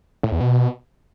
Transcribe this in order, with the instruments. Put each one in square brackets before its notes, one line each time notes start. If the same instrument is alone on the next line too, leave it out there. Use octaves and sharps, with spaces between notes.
[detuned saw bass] A2
E2
B2